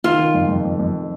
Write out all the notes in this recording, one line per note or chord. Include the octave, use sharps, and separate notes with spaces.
D#3 F4
D#3
F2
F2
F2
F2